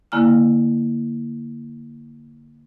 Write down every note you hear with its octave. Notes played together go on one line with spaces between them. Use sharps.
D3 A#3 E4 G#5 F6